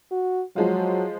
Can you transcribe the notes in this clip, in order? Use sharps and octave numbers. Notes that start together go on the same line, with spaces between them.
F#4
F3 F#3 G#3 F4